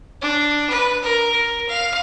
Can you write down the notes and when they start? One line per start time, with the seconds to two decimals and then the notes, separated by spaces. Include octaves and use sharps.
0.22 D4
0.70 B4
1.03 A#4
1.32 A#4
1.68 F5